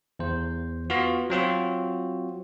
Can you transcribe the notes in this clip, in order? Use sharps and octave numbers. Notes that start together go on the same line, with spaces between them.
E2 C5
B3 F4 F#4
F#3 C4 F4 F#4